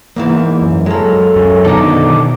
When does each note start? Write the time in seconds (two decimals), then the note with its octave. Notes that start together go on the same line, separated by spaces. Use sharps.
0.16 E2 G#2 E3 A#3
0.62 F#2
0.86 F#3 G#3 A#3 A4
1.36 F#2 C#4
1.65 B2 D3 D#3 D#4 A4 D6